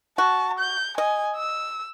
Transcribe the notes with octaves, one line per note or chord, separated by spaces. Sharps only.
F#4 A5
G6
D#5 G#5
E6